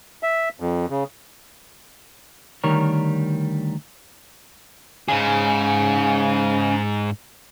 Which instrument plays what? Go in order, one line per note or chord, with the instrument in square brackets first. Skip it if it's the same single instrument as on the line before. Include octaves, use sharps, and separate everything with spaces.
[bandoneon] E5
F2
C#3
[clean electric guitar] D2 D#3 G3 A#4 C#5
[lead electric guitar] G#2 G#4 [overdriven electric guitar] C#3